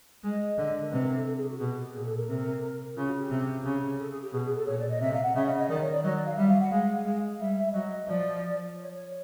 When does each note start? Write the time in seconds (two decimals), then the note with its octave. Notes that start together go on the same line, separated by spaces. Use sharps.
0.23 G#3 D#5
0.58 D3
0.82 A#4
0.92 C3 B4
1.03 A#4
1.15 A4
1.25 A4
1.37 G#4
1.48 F#4
1.60 B2 G4
1.77 G4
1.94 A#2 G#4
2.06 A4
2.17 A#4
2.29 C3 A#4
2.96 C#3 F4
3.07 F#4
3.20 G4
3.31 C3
3.64 C#3
3.99 A4
4.10 G#4
4.22 G4
4.33 B2 G#4
4.44 G#4
4.56 A4
4.67 A#2 C#5
4.78 D5
4.89 D#5
5.01 C3 E5
5.13 F5
5.23 F#5
5.35 C#3 E5
5.47 D#5
5.58 D#5
5.69 D#3 D5
5.81 C#5
5.93 D5
6.03 F#3 D#5
6.15 D5
6.25 F5
6.37 G3 E5
6.49 F5
6.60 F#5
6.71 G#3 F5
7.06 G#3
7.40 G3 E5
7.57 E5
7.73 F#3 D#5
8.08 F3 D5
8.76 C#5
8.93 C#5